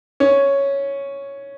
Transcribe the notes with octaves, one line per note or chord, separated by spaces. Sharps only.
C#4